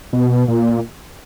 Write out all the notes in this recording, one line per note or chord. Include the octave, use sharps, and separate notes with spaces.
B2
A#2